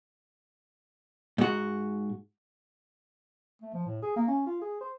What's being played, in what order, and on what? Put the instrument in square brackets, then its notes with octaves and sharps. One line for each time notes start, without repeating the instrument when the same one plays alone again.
[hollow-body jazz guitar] G#2 F#4
[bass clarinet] A3
F3
A2
G#4
A#3
C#4
F4
G#4
C5